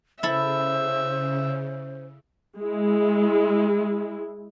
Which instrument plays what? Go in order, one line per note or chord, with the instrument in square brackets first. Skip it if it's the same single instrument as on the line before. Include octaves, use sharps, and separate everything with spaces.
[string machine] C#3 [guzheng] E4 A4 [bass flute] C5 [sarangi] E5
[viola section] G#3 E4